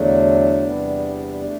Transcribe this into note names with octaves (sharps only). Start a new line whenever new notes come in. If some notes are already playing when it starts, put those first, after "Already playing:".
Already playing: E2 D3 F#3 A3 D4
E2 C3 G3 B3
A3